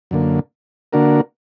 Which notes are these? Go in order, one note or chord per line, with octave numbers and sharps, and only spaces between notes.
F#2 D3 A#3
D3 A#3 D4 F#4 A#4